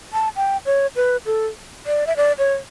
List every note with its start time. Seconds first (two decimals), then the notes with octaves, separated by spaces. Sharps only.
0.13 A5
0.36 G5
0.66 C#5
0.96 B4
1.26 A4
1.86 D5
2.07 E5
2.17 D5
2.38 C#5